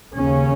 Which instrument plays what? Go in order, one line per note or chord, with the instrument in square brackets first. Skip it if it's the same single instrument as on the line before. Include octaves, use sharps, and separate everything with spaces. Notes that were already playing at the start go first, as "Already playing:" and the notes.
[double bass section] D#2 C#3 C#4